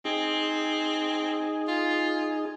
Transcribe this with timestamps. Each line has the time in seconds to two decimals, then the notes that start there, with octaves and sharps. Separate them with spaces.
0.05 C4 D#4 G#4
1.68 F4